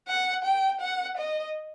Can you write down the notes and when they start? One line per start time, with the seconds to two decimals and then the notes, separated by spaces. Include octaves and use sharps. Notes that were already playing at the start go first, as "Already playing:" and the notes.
0.08 F#5
0.45 G5
0.81 F#5
1.18 D#5